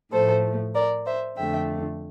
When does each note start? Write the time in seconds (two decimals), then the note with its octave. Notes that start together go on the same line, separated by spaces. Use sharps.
0.12 A2 F3 A3 A4 C5
0.75 A#4 D5
1.06 C5 E5
1.37 F2 D3 A3 E5 G5